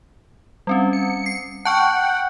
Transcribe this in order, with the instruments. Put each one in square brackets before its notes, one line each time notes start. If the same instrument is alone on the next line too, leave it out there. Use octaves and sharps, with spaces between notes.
[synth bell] G3 C4 C#4
[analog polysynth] C#7
[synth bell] C7
[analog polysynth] F#5 G5 [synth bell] A5 C#6 F6